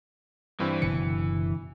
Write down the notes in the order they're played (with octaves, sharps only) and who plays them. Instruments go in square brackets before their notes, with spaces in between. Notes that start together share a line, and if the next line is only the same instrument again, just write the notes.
[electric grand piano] G2 C4 [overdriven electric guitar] E3
[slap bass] F#1 B2 D3 [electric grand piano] C#7